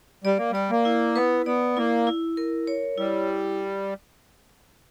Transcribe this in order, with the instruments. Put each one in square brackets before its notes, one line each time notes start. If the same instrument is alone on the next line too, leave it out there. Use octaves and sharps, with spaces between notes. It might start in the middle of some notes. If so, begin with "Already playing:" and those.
[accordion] G3 [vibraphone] D5
[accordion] A#3
[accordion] G3 [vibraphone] D5
[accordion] A#3
[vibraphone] E4
[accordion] B3 [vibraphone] B4
[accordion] B3 [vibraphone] D5
[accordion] A#3 [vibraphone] E4
[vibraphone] E4
A#4
C#5
[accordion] G3 [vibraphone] E4